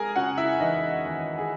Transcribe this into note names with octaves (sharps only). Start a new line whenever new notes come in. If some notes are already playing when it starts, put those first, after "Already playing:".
Already playing: G#3 G#4 A#4 G#5 A#5
C#3 F#4 F#5
E4 E5
E3 D#4 D#5
D#2
G#4